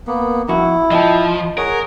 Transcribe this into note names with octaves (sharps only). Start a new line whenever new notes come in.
A#3 B3
F2 E4 F#4
F3 D#5 G5 A5
G#4 A#4 C#5 F#5